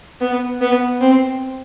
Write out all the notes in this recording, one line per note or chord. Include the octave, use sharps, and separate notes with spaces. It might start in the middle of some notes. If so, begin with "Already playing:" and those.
B3
B3
C4